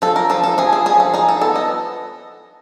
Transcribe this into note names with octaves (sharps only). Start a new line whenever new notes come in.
F3 A4
A#4
F3 A4
A4
F3 G#4
G#4
F3 G#4
A4
D#4 G#4
A4
B3 A4
D#5